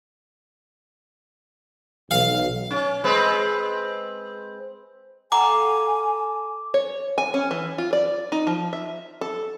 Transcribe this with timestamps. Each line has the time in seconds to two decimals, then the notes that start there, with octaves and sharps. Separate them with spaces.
2.11 B1 F5
2.71 C#4
3.04 G#3 C4 B4
5.32 A4 F5 F#5 G#5 A#5 D6
6.74 C#5
7.18 G#5
7.34 C#4
7.51 E3
7.78 F4
7.93 D5
8.32 D#4
8.47 F3
8.73 E5
9.21 A4